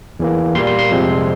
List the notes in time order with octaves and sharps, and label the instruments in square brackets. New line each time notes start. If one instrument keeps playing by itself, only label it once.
[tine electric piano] E2 E3 A#3
A#2 G3 A#3 C6
C6
C6
F2 C3 F3 G#3 C4